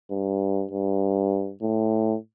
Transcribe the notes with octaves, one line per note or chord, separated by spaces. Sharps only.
G2
G2
A2